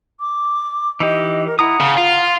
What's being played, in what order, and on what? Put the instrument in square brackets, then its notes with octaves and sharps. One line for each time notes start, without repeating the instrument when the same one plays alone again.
[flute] D6
[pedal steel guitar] E3 D#4 G4 [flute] D#5
[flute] A#4
[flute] E4 [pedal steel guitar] F#5 A#5 D#6
[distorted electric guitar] C#3 [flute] F5
[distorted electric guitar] F4